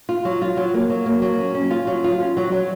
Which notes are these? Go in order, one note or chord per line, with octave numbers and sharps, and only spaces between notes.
F4
F#3
F4
F#3
A#3
F#3
A#3
F#3
C#4
C#4
F4
F#3
F4
C#4
F#3
F#3